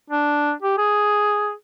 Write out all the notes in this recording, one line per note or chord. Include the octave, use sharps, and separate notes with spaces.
D4
G4
G#4